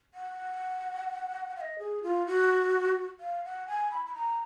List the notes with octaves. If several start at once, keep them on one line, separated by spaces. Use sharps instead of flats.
F#5
F5
D#5
G#4
F4
F#4
F5
F#5
G#5
B5
B5
A#5